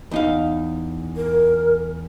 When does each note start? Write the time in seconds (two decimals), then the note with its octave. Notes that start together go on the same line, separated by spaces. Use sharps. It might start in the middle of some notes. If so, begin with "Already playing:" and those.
0.11 E2 D#4 F5
1.17 A#4